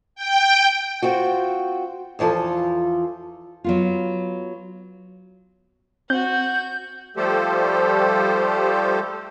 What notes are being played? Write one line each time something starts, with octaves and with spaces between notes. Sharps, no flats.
G5
C4 F4 F#4
E2 E3 F3 F4 A4
F#3 B3 F4
C4 F#4 F#5 G6
F3 G3 A3 G4 A4 C5